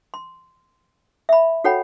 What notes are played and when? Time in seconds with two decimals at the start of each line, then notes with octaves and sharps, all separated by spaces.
0.14 C6
1.29 E5 B5
1.64 F#4 A4 C#5 F#5 G5 B5